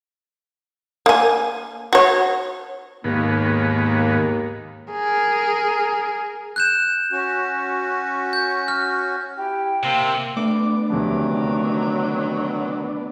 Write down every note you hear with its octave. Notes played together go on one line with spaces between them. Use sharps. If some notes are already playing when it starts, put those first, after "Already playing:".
A#3 G#5
F#4 C#5
D#2 G#2 D#3 A#3 B3
G#4 A#4
F#6 G6 E7
C#4 F#4
G6
F6
E4 G4 G5
C3 A#3 C4 F5
A3 B3 D4 D6
D2 C3 D#3 F3 F#3